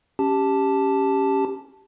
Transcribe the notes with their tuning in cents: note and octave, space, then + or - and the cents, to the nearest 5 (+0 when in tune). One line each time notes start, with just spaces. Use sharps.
C#4 +0 G4 +0 A5 +0